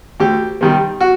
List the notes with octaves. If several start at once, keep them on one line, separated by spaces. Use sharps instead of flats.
D2 G4
C3 D#3 G3
F#4